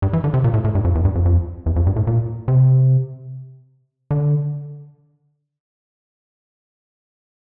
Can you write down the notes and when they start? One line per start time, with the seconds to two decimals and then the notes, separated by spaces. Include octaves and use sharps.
0.02 G2
0.13 E3
0.24 D3
0.34 C3
0.44 A#2
0.54 A2
0.64 A2
0.75 G2
0.84 F2
0.95 E2
1.05 G2
1.15 F2
1.26 F2
1.66 E2
1.76 F2
1.87 G2
1.96 A2
2.07 A#2
2.48 C3
4.11 D3